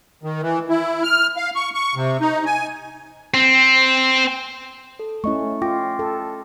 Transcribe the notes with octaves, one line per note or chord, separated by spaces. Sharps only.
D#3
E3
E4
F6
F5
C#6
C#6
C3
D#4
G#5
C4
A4
A3 C#4 E4 D#5 C#6
F4 G5 D6 A#6
A4